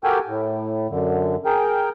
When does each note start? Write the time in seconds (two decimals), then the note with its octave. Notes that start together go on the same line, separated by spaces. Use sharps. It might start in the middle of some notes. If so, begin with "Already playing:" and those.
0.04 F#4 G4 A4 A#4 G5 G#5
0.28 A2
0.90 F#2 D3
1.45 G#4 A#4 G5